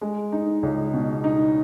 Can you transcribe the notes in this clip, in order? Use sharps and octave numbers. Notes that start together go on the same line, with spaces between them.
G#3
D#4
C#2
B2
D#4